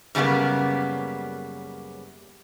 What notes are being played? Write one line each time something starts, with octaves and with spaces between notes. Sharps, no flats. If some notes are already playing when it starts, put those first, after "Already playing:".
F#2 C#3 G3 A#3 B3